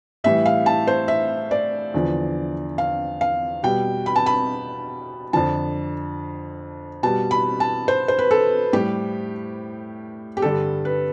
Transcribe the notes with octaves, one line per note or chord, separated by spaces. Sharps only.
A2 E3 G3 E5
F5
A5
C5
E5
D5
E2 D3 F3
F5
F5
B2 G3 G5
B5
A5
B5
F2 D3 F3 A5
B2 G3 A5
B5
A5
C5
C5
B4
A4
A2 G3 G4
G4
G2 D3 G3 A4
B4